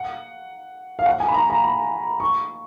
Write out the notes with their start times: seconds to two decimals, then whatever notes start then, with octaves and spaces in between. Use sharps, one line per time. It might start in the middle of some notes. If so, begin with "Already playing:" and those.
Already playing: F#5
0.99 F5
1.06 F#5
1.20 G#5
1.28 B5
1.34 A#5
1.50 A#5
1.64 B5
2.20 C#6